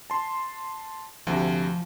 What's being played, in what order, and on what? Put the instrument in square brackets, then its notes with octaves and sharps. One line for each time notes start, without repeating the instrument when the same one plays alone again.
[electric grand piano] A5 C6
[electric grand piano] D2 C3 [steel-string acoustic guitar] F3